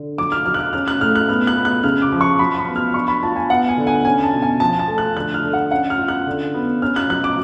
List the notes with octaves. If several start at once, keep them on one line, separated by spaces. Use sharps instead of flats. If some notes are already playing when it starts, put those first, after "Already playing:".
Already playing: D3
F#3 D6
F6
F#3 F6
F#6
F6
C#4 F6
F#6
A2 F6
F#6
B3 F6
F#6
B3
F#6
C#3 F6
D6
F3
C#6
F#3 B5
B5
B3
F6
D4 C#6
B5
F4 A5
G#5
B3 F#5
G#5
D3
G#5
C#4 G#5
A5
B2
G#5
F3 A5
A5
A3
F#6
D3 F#6
F6
D3
F#5
C#4 F#5
F6
F4
F#6
D3
B3
C#4 F6
F#6
F#3 F#6
D6